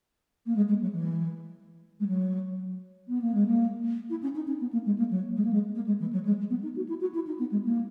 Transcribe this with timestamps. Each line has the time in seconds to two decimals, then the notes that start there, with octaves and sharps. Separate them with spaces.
0.46 A#3
0.56 G#3
0.68 G#3
0.81 F#3
0.93 E3
2.00 G#3
2.07 F#3
3.08 B3
3.21 A#3
3.34 G#3
3.46 A#3
4.10 E4
4.22 C#4
4.35 D#4
4.47 C#4
4.60 B3
4.72 A#3
4.86 G#3
4.98 A#3
5.10 F#3
5.36 G#3
5.44 A#3
5.53 G#3
5.75 A#3
5.86 G#3
6.00 E3
6.12 F#3
6.25 G#3
6.50 B3
6.63 D#4
6.76 F#4
6.88 E4
7.01 F#4
7.14 E4
7.27 D#4
7.39 B3
7.51 G#3
7.65 A#3